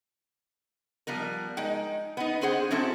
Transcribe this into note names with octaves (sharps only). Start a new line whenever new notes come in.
F3 G3 B3 A#4
G#3 D#4 G5
B3 D#4
D3 C4 G#4 C5 F#5
F#3 C4 C#4 E4 A4